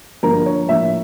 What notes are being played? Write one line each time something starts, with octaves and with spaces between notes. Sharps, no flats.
G2 D3 F3 A#3 D4 A#4
C#5
A2 F3 A#3 D4 E5